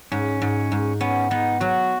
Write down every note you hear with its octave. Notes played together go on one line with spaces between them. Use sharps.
G#2 C#4
G#2
G#2
B3 C#4
B3 D#4
F#3 F#4